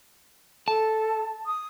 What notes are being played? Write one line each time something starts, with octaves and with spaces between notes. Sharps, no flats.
A4 A5
D#6